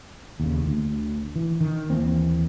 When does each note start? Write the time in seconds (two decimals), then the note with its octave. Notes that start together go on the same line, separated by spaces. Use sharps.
0.40 D#2 C#3
0.66 D2
1.36 E3
1.61 D#3
1.90 D#2 E3 A#3 C4